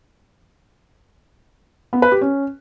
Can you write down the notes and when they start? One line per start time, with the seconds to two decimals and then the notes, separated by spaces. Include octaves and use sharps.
1.93 B3
2.02 B4
2.12 G4
2.21 C#4